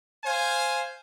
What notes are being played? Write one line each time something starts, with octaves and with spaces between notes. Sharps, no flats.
C5 F5 G#5